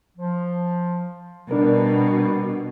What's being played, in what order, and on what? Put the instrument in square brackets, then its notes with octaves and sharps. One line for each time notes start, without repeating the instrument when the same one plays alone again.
[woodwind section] F3
[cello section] B2 [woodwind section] G3 [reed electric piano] D4 A#4